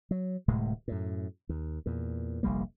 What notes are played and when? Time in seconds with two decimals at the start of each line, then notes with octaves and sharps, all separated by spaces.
0.11 F#3
0.48 D1 A2 C3 G#3
0.88 F#2 A2
1.49 D#2
1.86 E2 A#2
2.43 F1 A#1 G3 A#3